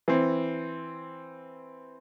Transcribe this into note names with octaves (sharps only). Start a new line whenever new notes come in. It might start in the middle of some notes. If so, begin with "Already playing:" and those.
E3 C4